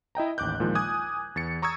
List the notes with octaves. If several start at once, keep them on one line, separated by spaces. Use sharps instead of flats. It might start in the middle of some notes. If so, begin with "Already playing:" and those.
E4 D#5 G5 A#5
A1 D#2 D6 F#6 G6
A#2 D#3 F3 G#3
G#5 D6 D#6 F#6 G#6
E2 A6 C#7
A#5 C#6 D#6 E6 G#6